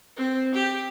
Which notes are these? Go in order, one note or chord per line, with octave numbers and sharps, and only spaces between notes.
C4
G4